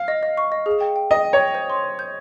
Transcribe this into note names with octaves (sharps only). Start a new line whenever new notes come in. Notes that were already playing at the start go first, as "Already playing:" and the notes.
Already playing: F5
D#5
D#5
C#6
D#5
G#4
G5
G5
D#5 G5
G5
C#5
G5
C5
C6
C5
G6